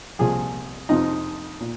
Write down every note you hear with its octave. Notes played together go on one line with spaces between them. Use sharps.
C2 A#2 F3 G#4
F2 C3 F3 D#4
A#2